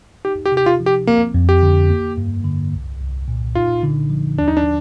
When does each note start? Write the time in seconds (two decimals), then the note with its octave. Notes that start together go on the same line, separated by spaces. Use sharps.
0.25 D#4 G4
0.46 G4
0.52 C3
0.57 G4
0.66 F4
0.80 F3
0.86 G4
1.07 A#3 C4
1.34 F2
1.49 G4
1.63 D3
1.90 A#3
2.17 G2
2.45 D3
2.73 C2
3.01 C2
3.28 A#2
3.55 D#4 F4
3.83 D3
4.10 F3
4.38 D#2 D4
4.48 D#4
4.57 D4